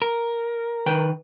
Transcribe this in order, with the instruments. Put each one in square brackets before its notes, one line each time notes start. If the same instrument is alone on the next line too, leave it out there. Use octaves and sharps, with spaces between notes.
[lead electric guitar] A#4
[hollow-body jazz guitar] D#3 B4 G5